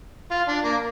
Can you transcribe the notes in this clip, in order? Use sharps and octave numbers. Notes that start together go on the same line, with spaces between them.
F4
D4
A#3